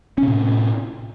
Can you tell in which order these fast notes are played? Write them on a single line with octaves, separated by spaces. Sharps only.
C#4 C3 A2